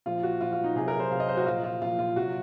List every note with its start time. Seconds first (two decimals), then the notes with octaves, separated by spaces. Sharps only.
0.06 A#2 F3 F4
0.23 F#4
0.41 A#2 F3 F4
0.53 F4
0.64 D#4
0.76 C3 F#3 G#4
0.88 A#4
1.00 C5
1.11 C3 F5
1.15 F#3
1.20 D#5
1.29 C5
1.37 F#4
1.46 A#2 F3 F4
1.64 F4
1.82 A#2 F3 F4
1.99 F4
2.16 C3 F#3 F#4